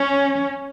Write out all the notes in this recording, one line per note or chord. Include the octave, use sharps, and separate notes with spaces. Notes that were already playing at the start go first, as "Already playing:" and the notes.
Already playing: C#4